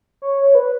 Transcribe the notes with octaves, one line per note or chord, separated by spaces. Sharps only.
C#5
C#5
B4